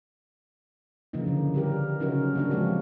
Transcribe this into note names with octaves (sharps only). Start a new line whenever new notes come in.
C#3 E3 F3 A#3 D#4
D3
G3 G4 A#4
C#3 F#3 C#4 D#4 F#4 A#4
A#3 D4 F#4
F3 G#3 A#3 C4 F#4 G4